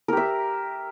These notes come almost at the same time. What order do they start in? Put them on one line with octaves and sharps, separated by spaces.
A#4 G4 E5